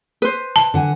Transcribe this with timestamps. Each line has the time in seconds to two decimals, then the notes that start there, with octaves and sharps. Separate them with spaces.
0.22 B4 C5
0.56 A5
0.74 D3 F#5 G#5